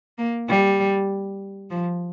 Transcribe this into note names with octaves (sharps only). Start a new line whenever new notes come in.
A#3
G3
F3